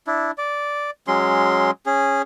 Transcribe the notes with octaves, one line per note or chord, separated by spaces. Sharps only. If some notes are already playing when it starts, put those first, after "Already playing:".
D4 E4
D5
F#3 G#3 C#4 C6
C#4 G#4